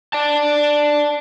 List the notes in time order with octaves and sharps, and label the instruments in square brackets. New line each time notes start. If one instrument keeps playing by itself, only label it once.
[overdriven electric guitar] D5 A5